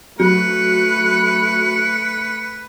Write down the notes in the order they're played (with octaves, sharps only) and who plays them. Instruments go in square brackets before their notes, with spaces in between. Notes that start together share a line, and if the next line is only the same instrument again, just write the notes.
[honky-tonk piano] F#3 [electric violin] A3 F#6 [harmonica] B4 [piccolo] C#7